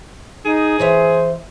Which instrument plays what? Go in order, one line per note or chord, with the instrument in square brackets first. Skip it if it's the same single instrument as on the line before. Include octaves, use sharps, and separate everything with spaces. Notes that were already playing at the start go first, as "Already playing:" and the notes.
[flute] D#4 [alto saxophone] G#4
[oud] E3 C#5 E5 [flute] C5